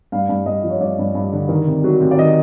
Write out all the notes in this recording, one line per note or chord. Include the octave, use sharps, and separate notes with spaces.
G2 F5
G2
G2 D#5
F3
C#5
G2 D5
G2
G2
D3
D#3
C3
F#3
C3
D5
D#3 D#5